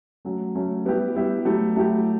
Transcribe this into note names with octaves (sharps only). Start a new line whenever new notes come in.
F#3 A3 C#4
F#3 A3 C#4
G3 B3 E4 G4
G3 B3 E4 G4
F#3 A3 E4 G4
F#3 A3 E4 G4